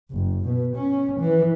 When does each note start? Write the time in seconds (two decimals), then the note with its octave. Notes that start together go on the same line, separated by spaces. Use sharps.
0.11 F#1
0.45 B2
0.76 C#4
1.20 E3